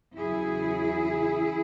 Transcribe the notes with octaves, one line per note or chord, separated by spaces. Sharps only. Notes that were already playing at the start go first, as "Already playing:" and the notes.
E2 C#3 F#3 E4 G#4